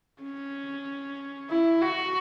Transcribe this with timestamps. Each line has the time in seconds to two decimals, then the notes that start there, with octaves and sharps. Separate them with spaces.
0.22 C#4
1.49 E4
1.82 F#4